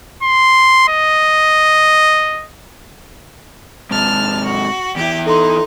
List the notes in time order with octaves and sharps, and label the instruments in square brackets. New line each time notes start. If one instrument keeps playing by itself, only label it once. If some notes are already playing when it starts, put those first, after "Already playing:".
[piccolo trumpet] C6
D#5
[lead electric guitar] G#2 C3 [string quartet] A5 F6
[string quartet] F#4
[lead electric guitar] E2 E4 [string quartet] G4
[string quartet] D#4 [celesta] A4 C6